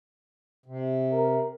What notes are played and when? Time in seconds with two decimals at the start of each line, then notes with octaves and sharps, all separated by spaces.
0.66 C3
1.12 A#4